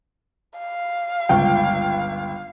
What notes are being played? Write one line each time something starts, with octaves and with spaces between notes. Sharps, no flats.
F5
G1 C#2 G5